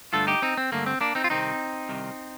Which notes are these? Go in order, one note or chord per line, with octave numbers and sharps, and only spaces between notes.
G2 D3 A3 F4 A4
D#4 G4
C4 D#4
C4
G2 D3 A3 A#3
C4
A#3 D4
C4 D#4
F4
C2 C3 D#3 C4 D#4
C2 C3 D#3